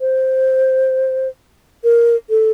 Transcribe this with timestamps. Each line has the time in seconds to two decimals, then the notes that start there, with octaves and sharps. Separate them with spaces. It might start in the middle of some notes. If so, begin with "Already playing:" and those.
0.01 C5
1.84 A#4
2.30 A4